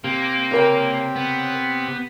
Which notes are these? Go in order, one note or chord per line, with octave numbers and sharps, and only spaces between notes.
C3 A#3 G4
C#3 A#4 G5
B3